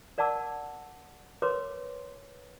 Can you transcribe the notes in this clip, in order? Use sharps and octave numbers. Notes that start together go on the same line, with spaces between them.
A#4 D5 F#5 A5 D6 E6
A#4 B4 C#5 C6 D6